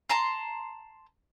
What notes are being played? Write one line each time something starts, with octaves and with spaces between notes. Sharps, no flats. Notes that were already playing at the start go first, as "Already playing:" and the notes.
A5 A#5 C6